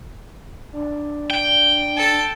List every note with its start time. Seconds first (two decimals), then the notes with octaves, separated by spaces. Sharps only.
0.73 D4
1.31 G5
1.97 A4 A5